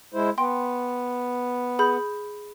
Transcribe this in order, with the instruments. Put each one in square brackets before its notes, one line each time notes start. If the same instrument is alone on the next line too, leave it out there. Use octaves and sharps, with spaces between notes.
[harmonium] G#3 E4 C5
[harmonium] B3 [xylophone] G5 C6
[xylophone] G#4 B5 G6